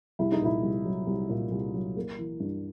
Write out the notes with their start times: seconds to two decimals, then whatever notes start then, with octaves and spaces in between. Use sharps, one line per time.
0.19 C2 E4
0.32 D#4
0.41 A#2 E4
0.63 C2
0.85 F#3
1.07 C2
1.30 A#2
1.52 C2
1.74 F#3
1.96 A#3
2.19 E3
2.40 G2